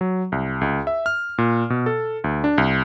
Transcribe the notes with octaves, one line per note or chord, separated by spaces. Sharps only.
F#3
C2
C#2
E5
F6
A#2
B2
A4
D2
D4
C2